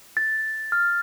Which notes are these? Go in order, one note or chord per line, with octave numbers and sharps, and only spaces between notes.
A6
F6